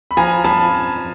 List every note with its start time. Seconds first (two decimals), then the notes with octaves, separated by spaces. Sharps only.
0.11 B5
0.17 F3 G#5 A#5
0.44 F3 A5 B5